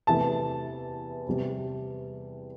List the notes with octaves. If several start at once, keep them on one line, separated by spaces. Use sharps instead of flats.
E2 C3 E3 A3 A5
E2 C3 G3